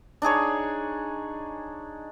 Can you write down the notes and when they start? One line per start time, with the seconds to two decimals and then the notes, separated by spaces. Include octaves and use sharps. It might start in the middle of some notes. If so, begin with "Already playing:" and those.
0.22 D4 D#4 G#4 C#5